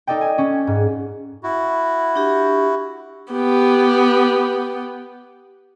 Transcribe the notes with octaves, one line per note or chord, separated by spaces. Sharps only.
D#4 A4 D5 D#5 G5
G#5
C#4
G#2
E4 F#4
D4 G4
B3 G4